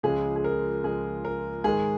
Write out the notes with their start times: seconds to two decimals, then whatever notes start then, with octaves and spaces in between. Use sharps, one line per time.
0.03 C#2 C#3 F3 G#3 G#4
0.36 G#4
0.44 A#4
0.84 C#2 C#3 F3 G#3 G#4
1.25 A#4
1.64 G#2 D#3 G#3 G#4